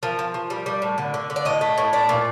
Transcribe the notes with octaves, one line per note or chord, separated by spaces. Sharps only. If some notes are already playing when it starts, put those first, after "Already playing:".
F3 A#4
F3
F3
G3
G3
A2
D3
D3
D3
D5
A2 D#5
A3
A2
A3 D5
A#2